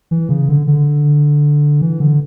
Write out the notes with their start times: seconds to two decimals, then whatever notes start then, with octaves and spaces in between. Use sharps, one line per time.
0.11 E3
0.29 C#3
0.49 D3
0.67 D3
1.82 E3
2.00 D3